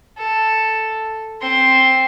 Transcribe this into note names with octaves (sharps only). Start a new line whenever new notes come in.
A4
C4 C6